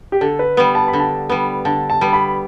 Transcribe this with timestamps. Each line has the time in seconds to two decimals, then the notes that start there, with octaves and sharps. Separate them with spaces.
0.12 G4
0.21 D3 A4
0.39 B4
0.57 G3 B3
0.75 A5
0.88 B5
0.93 D3
1.00 A5
1.29 G3 B3
1.65 D3 A5
1.90 A5
2.01 G3 B3
2.13 B5